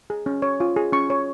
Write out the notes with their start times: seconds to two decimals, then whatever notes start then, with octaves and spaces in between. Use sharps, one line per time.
0.10 G#4
0.26 C#4
0.42 C#5
0.60 F4
0.76 G#4
0.93 C#4 C#6
1.10 C#5